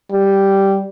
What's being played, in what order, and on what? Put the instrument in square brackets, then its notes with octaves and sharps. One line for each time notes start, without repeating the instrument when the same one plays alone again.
[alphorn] G3